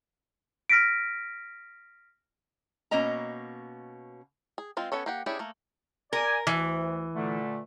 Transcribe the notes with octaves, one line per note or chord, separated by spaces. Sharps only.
F6 A#6 B6 D7
B2 A#3 C#4 D#5 A#5
G#4
G#3 C4 F4
B3 C#4 A4 C#5
A#3 G4 F#5
C#4 D4 E4 G4 G#4
A3 A#3
A#4 D5 G#5
D2 E3
A#2 D3 A3